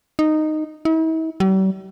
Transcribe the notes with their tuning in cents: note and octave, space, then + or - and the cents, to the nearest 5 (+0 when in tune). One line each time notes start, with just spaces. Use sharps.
D#4 -10
E4 -45
G3 -45